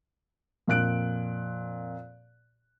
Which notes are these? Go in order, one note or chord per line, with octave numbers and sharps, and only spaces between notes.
F2 A#2 F#6 D7